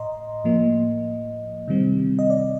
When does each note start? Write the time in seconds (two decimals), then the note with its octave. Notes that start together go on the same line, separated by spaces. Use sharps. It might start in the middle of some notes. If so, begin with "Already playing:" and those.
Already playing: A2 D#5 A#5 C6
0.44 A2 F3 A#3
1.68 C3 D#3 G3 C4
2.19 D#5
2.30 D5